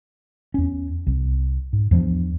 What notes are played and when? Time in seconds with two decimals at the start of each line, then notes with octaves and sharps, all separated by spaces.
0.54 E2 C#4
1.07 C2
1.73 G#2
1.91 E2 F3 G3 D4